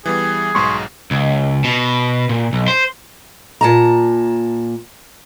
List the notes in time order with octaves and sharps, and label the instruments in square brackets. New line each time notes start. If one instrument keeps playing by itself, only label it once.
[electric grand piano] E3 G3 B3 [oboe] G#4
[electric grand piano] B1 G#2 B2 [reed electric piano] C6 C#6
[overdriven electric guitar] C#2
B2
A#2
B1
C5
[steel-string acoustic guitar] A#2 A5 A#5